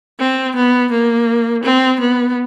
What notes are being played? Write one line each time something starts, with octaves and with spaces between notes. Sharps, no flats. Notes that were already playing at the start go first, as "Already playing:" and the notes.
C4
B3
A#3
C4
B3